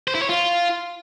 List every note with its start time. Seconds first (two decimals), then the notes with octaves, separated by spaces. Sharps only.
0.08 C5
0.15 E4
0.22 C#5
0.29 F4